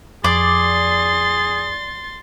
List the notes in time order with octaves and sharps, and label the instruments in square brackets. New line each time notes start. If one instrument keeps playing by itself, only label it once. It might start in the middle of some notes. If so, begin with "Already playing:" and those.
[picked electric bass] F2 [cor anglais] G#4 [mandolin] D5 [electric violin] C6 A6